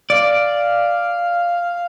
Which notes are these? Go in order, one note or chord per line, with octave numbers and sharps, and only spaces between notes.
D5 F5